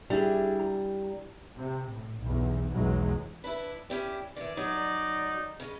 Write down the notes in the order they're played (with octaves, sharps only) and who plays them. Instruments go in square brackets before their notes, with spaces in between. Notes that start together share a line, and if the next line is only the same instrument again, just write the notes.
[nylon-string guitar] G3 [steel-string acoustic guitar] D4 E4 G#4
[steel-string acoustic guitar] A#5
[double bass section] C3
A2
B1 E2
B1 E2 E3 F#3 G#3
[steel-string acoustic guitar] D4 E4 [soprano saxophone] B4
[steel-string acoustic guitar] C#4 E4 D5 [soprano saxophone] G4
[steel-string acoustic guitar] D#3 E3 [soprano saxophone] D5
[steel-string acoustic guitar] F#3 [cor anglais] D#4
[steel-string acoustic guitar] C#3 D#5